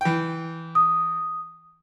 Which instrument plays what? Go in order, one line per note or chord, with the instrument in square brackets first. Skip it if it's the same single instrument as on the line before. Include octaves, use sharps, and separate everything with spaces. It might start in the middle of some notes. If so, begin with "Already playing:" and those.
[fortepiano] E3 G5
[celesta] D#6